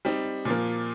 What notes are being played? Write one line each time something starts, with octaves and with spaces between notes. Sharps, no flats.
G3 C4 D#4
A#2 F3 A#3